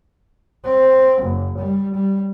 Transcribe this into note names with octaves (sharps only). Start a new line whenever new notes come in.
C4
F#1
G3
G3